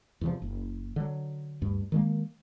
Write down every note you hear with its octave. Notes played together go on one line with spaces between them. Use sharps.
E2 C3 F3
F#1
D3 F#3
D2 G2
D#3 G#3 A#3